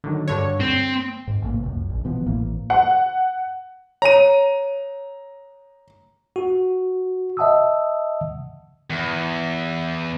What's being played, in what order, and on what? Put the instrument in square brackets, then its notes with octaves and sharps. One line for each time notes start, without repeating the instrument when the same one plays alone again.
[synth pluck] D3 D#3 F#3
G2 D3 C#5
[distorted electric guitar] C4
[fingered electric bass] G#2
A1 C3 F3 A#3
F#1 C#2 F#2
A#1
B2 E3 F3 B3
A1 A2 E3 A#3
[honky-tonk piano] F#5
[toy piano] C#5 [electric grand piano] A#5 D#7
[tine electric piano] F#4
D#5 E5 F#5 A5 D#6 E6
[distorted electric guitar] E2